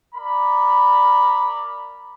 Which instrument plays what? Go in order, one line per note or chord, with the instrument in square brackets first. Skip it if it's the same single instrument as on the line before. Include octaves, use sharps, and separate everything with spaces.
[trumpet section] A#4 D5 B5